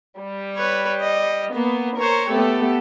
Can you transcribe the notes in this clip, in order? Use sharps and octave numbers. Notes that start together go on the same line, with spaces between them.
G3
B4 C#5
D#5
A#3 B3
A#4 C5 C#5 C#6
A3 B3 G4 A4